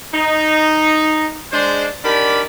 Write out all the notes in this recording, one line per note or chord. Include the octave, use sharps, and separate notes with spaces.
D#4
G#3 D4 C5
D#3 D4 G4 A#4 D5 B5